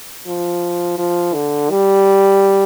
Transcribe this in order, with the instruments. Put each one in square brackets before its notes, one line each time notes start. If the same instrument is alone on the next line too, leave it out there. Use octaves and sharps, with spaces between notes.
[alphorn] F3
F3
D3
G3